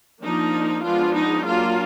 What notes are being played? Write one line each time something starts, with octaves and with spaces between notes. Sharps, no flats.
F3 A#3 D4 D#4
F3 G#3 B3 D4 F4
D#4
F#3 A#3 D4 F4